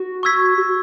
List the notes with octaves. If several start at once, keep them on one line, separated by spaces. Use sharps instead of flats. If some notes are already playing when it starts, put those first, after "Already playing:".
Already playing: F#4
C#6 E6 G#6 B6
F#4